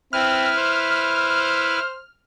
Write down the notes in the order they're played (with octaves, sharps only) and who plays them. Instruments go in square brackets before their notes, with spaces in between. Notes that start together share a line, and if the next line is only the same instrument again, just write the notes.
[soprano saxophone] C4 [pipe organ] E4 B4 [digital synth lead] F6
[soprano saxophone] C5